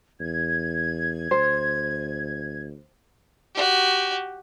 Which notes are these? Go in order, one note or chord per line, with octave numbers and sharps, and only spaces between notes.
E2 G#6
D2 C5
F#4 G4